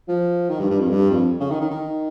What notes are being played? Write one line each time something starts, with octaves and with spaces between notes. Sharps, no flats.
F3
D#3
G2
G2
F2
G2
F2
C#3
D#3
D#3
D#3